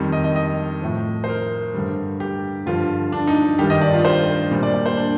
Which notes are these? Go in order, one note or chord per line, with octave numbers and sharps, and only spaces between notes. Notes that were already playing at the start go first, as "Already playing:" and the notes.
Already playing: F2 D#3 G3
D#5
D#5
D#5
A2 F3
C5
A#4
G2 D3 G3
G4
G2 D3 F3 F4
D4
D#4
G2 D#3 G3 G4
D#5
D5
F4
C5
A#2 G3
D5
D5
C5
D4